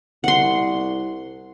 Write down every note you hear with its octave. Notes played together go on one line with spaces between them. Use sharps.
C2 F#5 C6